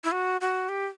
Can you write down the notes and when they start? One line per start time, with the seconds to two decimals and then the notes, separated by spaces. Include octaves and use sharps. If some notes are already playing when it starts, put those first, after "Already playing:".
0.04 E4
0.12 F#4
0.41 F#4
0.69 G4